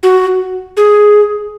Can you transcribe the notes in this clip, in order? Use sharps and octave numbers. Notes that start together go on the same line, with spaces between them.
F#4
G#4